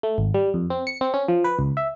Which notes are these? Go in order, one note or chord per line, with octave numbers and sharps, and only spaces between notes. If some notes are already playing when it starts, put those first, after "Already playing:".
A3
G#1
G3
F2
C4
C#7
C4
C#4
F3
B4
C#2
E5